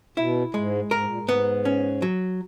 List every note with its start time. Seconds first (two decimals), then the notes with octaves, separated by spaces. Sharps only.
0.17 B2 E4
0.54 G#2 G#3
0.91 G#2 A#4
1.05 A#2
1.19 G#2
1.29 B3
1.65 C#4
2.02 F#3